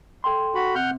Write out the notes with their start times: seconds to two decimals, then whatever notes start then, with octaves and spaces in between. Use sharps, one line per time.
0.24 A4 G5 C6
0.55 F#4 B5
0.75 C3 F#5 F6 G6